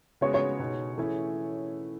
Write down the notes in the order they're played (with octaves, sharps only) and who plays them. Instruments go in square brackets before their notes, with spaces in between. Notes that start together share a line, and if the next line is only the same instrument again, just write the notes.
[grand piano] C#3 G#3 B3 F#4 [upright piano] C#5
[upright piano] C#5
[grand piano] B2 G#3 D#4 F#4
E3 A3 C#4 E4 G#4